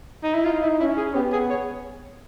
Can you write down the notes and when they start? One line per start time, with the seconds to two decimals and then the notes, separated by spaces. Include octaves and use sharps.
0.23 D#4
0.34 E4
0.45 D#4 F4
0.63 E4
0.79 C#4 E4
0.97 G#4
1.15 B3 G4
1.32 G#4
1.50 C#5